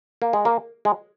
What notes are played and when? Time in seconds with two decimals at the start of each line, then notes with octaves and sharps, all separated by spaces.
0.22 A#3
0.33 G#3
0.45 A#3
0.85 G#3